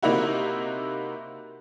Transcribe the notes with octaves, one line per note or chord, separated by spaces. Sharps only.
C3 A#3 D#4 E4 F#4